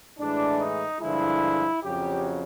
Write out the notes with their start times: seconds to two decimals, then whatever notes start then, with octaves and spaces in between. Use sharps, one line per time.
0.18 A2 E3 G#3 D4
0.59 D#4
1.00 G2 D3 F3 G#3 E4
1.83 F2 C#3 F#3 G4